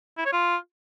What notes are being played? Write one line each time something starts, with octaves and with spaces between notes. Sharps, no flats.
E4
C#5
F4